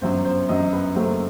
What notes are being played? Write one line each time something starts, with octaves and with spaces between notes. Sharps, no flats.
G1 F#2 F#3 C5
C5
G1 F#2 F#3 D#5
B4
F#1 F#2 F#3 A3 C5